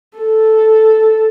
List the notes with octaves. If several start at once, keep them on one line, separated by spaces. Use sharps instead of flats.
A4